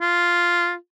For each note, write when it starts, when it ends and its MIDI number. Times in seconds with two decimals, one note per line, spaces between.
0.01 0.74 65